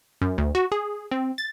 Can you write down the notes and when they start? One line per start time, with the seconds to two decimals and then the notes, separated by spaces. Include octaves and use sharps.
0.21 F#2
0.38 D2
0.55 F#4
0.72 G#4
1.11 C4
1.38 A6